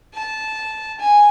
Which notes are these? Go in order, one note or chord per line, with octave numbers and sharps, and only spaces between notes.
A5
G#5